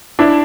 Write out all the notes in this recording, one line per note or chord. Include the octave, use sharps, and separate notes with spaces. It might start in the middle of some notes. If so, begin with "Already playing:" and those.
D4 E4